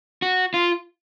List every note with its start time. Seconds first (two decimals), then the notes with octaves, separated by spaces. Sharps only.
0.22 F#4
0.54 F4